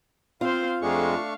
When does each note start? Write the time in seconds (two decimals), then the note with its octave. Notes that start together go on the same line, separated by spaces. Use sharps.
0.41 C4 F4 C5 F5
0.82 F2 G#3 A3 D4 F5 C#6